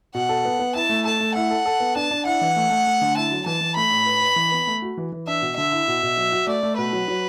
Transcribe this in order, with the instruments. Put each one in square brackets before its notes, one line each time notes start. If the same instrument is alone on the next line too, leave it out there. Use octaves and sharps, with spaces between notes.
[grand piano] B2 [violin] F#5
[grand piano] A4
B3
B3
[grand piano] E4 [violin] A5
[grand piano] A3
[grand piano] A4 [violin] A5
[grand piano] A3
[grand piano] E4 [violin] F#5
[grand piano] A4
A4
B3
[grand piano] D4 [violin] A5
[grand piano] D4
[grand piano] E4 [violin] F#5
[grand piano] E3
A3
A3
A3
D3
[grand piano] E4 [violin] A5
[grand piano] F#3
[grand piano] E3 [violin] A5
[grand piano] E3
[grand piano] A3 [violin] B5
[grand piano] A2
B4
B4
E3
B3
A3
F#4
E3
E3
[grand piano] D4 [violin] E5
[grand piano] B2
[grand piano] D3 [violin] E5
[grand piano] E4
B2
B2
F#3
F#4
[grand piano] A3 [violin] D5
[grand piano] A3
[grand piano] B2 [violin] B4
[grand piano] F#3
F#3